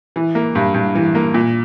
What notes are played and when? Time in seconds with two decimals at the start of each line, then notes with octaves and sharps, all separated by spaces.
0.16 E3
0.35 A#3
0.55 G2
0.74 G2
0.95 E3
1.15 A#3
1.34 A#2